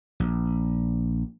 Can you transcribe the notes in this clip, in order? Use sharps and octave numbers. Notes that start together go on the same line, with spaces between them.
A#1